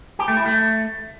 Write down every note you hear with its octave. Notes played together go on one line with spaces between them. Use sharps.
G4
A3
E4
A3